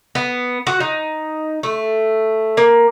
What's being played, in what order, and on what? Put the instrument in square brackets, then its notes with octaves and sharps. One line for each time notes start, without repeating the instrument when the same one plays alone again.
[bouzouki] B3
F#4 F#5
D#4
A3
A#3